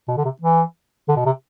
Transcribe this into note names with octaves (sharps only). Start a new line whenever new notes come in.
B2
D3
C3
E3
D3
B2
C3